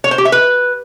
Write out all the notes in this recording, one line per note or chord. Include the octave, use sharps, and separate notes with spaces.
C#5
C5
G4
E5
B4